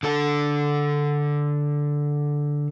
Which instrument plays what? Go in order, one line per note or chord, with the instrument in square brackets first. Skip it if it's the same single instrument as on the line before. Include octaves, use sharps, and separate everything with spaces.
[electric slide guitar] D3 A4 A5